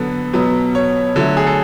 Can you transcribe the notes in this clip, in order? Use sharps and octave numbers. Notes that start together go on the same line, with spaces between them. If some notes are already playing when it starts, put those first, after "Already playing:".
Already playing: D3 F#3 B3 A4
B2 F#3 B3
C#5
D3 F#3 A3
G#4
A4